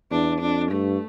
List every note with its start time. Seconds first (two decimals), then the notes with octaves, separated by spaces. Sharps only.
0.11 E2 D4
0.41 F2 D4
0.70 G2 A3